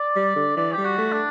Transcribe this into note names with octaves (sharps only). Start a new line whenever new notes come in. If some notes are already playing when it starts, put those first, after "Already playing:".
Already playing: D5
G3
D3
E3 D5
G4
G3
F#4
A3
D4